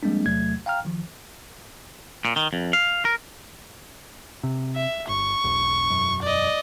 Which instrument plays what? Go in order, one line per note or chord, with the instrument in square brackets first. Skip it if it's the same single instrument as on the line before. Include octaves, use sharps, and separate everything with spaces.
[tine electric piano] F3 G3 G#3 A#3 C4 D4
E2 C3 F#3 A3 G#6
F5 G5 A#5 F6
D#3 F3
[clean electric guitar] A#2
D#3
F2
F5
A#4
[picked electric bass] C3
[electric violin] E5
[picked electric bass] G1 [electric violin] C#6
[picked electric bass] E1 B1
E1 F#2
[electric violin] D5 D#5